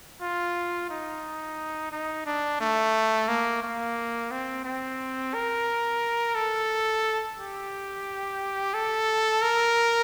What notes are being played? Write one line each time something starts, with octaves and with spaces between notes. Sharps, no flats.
F4
D#4
D#4
D4
A3
A#3
A#3
C4
C4
A#4
A4
G4
A4
A#4